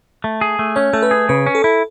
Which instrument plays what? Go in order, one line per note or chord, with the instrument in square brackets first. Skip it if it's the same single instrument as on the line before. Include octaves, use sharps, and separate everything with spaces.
[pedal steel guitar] A3
G#4
A3
[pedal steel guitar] C#4 [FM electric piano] C#5
[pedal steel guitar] A3 [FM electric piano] A4
[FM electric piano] B4
[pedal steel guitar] G#4
[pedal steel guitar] C#3 [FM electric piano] B4
[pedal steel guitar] C#4
[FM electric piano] A4
[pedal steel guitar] E4